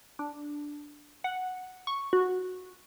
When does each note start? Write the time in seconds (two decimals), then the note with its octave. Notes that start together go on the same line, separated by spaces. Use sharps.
0.19 D4
1.24 F#5
1.87 C#6
2.13 F#4